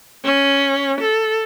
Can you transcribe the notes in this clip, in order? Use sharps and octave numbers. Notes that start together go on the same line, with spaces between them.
C#4
A4